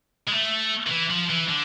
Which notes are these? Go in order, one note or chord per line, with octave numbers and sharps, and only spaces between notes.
G#3
A3
D#3
E3
F3
E3
D3